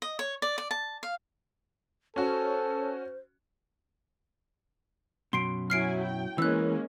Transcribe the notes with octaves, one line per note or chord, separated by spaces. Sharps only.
D#5
C#5
D5
D5
A5
F5
C#4 F#4 A4 C5
F#2 B2 C6 C7 D7
F#3 E4 G#5 F6 C7 D7
G5
E3 G#3 A#3 B3 C#4 E6 F#6